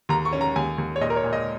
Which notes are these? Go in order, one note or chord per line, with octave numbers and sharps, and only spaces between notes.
D#2 A#5
C#6
C#4
A#5
D#2 G#5
D#2
C#5
A#2 D#5
A#4
C#5
A#2
D#5